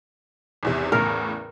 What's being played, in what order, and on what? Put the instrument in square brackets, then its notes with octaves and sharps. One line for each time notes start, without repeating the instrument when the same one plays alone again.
[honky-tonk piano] G#1 E2 C3
[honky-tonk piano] E2 A2 C#3 [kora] A#4